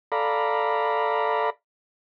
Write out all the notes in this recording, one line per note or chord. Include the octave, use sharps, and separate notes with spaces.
A4 D5 F5 A#5 B5